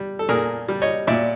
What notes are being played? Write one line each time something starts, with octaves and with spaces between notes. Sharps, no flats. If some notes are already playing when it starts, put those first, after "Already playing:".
Already playing: G3
A4
A#2 G#4 A#4
G3
C#5 D#5
A#2 D5 E5